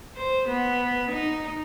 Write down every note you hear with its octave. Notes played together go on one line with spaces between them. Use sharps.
C5
B3
D#4